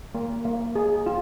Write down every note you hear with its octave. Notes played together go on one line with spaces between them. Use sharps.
A#3
A#3
G#4
F4